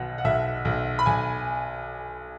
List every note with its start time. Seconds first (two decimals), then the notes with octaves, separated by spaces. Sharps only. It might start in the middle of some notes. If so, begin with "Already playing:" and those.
Already playing: B1 B2 F#5
0.18 F#5
0.24 B1 E5
0.65 B1
0.99 B5
1.06 B1 G#5